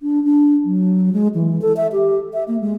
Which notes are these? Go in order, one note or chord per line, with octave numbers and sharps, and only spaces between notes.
D4
D4
F#3
G#3
E3
A4
E5
G4
E5
A#3
G#3